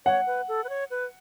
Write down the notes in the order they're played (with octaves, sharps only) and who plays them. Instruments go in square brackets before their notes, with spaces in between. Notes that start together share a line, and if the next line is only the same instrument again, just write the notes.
[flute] C#5 [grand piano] F#5
[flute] B4
A4
B4
C#5
B4